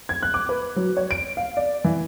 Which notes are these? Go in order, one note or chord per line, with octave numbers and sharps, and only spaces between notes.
G#6
F#6
D6
B4
F#3
C#5
D7
F5
D5
E3